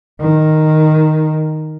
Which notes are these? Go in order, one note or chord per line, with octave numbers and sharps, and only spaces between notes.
D#3